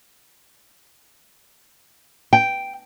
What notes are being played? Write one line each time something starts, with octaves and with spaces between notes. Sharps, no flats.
G5